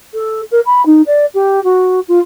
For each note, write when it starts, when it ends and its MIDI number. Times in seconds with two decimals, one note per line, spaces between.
0.13 0.41 69
0.51 0.60 70
0.65 0.84 83
0.85 1.01 63
1.06 1.25 74
1.34 1.62 67
1.63 1.99 66
2.08 2.19 65